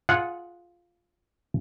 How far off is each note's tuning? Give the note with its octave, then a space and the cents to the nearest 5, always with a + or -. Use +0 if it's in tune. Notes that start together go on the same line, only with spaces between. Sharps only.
F4 +0 G#4 +15 F#5 -15